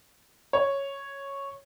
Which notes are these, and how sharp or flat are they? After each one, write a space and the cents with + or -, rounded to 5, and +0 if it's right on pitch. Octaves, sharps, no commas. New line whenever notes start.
C#5 -5